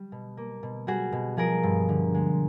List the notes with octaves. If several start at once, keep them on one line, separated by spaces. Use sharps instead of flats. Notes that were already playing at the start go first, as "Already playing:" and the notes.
Already playing: G3
B2
A#3
B2
G3 F#4 G#4
B2
F3 G#4 A#4
G2
D3
G#3